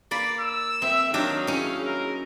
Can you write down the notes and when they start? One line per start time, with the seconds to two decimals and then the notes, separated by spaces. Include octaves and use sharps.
0.11 A#3 D5 B5
0.40 E6
0.82 C4 E5
1.14 D#3 F#3 D4 G4 F5
1.47 C#4 D#4 E4 G#4
1.84 A#4